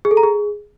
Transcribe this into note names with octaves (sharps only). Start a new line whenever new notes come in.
G#4
A4
A#5
G#4